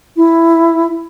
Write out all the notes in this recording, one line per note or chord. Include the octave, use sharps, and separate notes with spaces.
E4